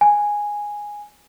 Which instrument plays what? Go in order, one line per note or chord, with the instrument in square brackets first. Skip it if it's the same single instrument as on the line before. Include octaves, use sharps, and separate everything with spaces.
[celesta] G#5